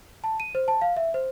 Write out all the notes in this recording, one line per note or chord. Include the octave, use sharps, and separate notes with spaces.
A5
D#7
C5
A5
F5
E5
C5